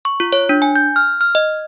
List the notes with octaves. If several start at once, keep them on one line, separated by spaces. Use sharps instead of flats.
C#6
F4
C#5
D4
G#5
G6
F6
F6
D#5